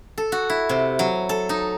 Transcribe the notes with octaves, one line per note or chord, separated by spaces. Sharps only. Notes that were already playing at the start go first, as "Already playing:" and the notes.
A4
F#4
E4
C3
F#3
A4
D#4